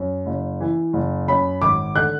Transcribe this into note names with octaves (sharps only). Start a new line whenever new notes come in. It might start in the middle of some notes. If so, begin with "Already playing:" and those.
Already playing: F#2
F#1
E3
F#1
F#2 B5
G#1 D6
D3 F#6